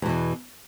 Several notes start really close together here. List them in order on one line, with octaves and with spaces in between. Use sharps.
E2 B2 E3